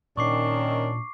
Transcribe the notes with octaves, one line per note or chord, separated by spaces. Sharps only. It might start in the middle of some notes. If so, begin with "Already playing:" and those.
A#2 D#3 C#4 D4 C#6 D6 C7